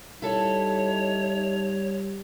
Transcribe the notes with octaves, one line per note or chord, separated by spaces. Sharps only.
G3 D#4 E4 A4 C#5